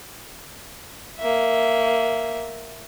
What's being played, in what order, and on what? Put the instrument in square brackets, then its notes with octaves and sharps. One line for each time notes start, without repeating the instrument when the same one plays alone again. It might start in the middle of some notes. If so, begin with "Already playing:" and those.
[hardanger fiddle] A#3 E5